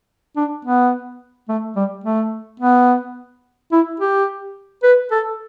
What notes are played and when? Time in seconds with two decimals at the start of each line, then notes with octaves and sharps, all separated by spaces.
0.36 D4
0.65 B3
1.49 A3
1.76 G3
2.04 A3
2.60 B3
3.72 E4
4.00 G4
4.83 B4
5.11 A4